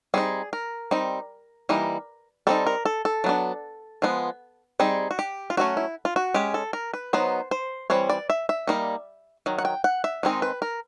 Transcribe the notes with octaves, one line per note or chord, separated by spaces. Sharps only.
G3 C4 D#4 G#4
A#4
G3 C4 D#4
E3 G3 A#3 D#4
G3 C4 D#4 A4
A#4
A4
A4
F#3 B3 D4
F3 G#3 B3
G3 C4 D#4 G#4
F#4
G4
F4
F#3 A3 C#4 F#4
E4
F4
F#4
G#3 C#4 G4
A4
A#4
B4
F#3 B3 D#4 C5
C5
E3 G3 C4 C#5
D5
E5
E5
G3 A#3 D#4
D#3 F#3
F#5
G5
F#5
E5
D#3 G#3 C4 D#4
B4
A#4